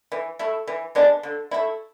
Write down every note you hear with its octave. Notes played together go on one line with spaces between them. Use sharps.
E3
A3 E4
E3
G#3 B3 D4
D3
A3 E4